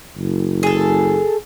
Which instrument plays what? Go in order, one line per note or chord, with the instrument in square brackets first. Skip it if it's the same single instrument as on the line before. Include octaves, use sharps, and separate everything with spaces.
[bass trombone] F#1
[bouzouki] G#4 A4